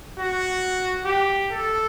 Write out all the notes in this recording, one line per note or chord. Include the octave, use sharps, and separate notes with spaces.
F#4
G4
A4